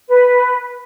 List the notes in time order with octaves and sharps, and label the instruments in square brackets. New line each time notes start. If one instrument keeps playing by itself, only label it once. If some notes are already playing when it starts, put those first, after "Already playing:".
[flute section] B4